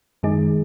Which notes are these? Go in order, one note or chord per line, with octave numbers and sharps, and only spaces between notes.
F#2 D#3 G#3 D#4 G#4